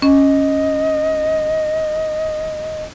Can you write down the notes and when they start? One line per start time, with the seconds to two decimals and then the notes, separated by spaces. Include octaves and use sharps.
0.02 C#4 D#5